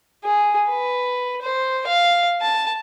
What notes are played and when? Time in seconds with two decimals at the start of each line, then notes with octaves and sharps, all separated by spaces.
0.24 G#4
0.69 B4
1.42 C5
1.87 F5
2.42 A5